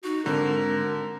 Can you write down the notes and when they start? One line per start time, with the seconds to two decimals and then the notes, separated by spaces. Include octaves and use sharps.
0.04 D#4 F#4
0.26 G#2 D3 C4 A#4 A#5